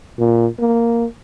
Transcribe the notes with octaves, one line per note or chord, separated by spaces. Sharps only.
A#2
A#3